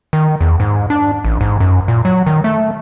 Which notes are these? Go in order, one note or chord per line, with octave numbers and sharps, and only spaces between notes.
D#3
E2
G#2
D4
A1
G#2
F#2
A#2
F#3
D#3
A3